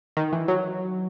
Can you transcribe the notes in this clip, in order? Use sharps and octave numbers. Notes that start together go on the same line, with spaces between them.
D#3
E3
F#3